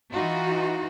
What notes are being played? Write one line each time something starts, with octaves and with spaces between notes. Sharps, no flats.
E3 D#4 F4 F#4